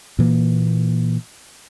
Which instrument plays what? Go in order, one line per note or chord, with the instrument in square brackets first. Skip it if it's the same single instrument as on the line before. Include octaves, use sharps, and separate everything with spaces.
[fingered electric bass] A#2 E3 A#3